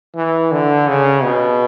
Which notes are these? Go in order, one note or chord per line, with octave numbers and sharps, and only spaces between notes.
E3
D3
C#3
B2